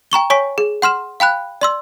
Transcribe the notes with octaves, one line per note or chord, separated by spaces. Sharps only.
G5 A#5 C#6 G7
C#5 G#5 C#6 B6
G#4
F#5 C6 F6 E7
F5 G5 B5 F#6
D5 C6 E6